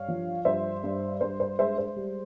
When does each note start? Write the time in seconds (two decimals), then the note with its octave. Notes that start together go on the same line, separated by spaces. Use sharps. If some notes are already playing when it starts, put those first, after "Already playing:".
Already playing: G2 C#5 F5
0.08 F3
0.45 G2 C5 E5
0.84 G2
1.21 G2 C5
1.40 C5
1.59 G#3 C5 E5
1.78 C5
1.96 G3